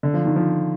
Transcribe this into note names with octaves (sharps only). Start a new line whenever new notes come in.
D3
F3
D#3
F3